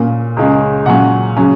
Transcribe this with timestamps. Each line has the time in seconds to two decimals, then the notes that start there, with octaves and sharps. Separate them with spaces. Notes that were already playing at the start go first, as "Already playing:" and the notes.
Already playing: A#2 A#3 C#4
0.37 C#2 C#3 G#3 C#4
0.86 A#2 F#3 C#4 F#5
1.37 C#3 F#3 C#4